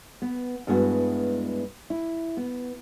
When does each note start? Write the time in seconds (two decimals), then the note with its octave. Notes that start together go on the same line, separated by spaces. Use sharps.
0.22 B3
0.67 G2 G#3 B3 E4 F#4
1.90 E4
2.37 B3